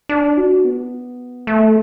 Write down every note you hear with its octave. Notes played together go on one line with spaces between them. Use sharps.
D4
F#4
B3
A3